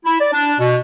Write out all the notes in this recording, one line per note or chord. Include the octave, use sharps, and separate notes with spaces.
E4
D5
D4
B2